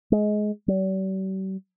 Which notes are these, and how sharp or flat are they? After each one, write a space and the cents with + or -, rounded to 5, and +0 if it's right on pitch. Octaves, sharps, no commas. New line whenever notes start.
G#3 +20
G3 -45